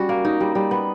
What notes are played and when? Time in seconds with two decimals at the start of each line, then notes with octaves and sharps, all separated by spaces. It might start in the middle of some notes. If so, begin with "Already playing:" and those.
Already playing: G3 C#4 F#4
0.09 A#3
0.25 D#4
0.40 G3
0.55 G3
0.71 B3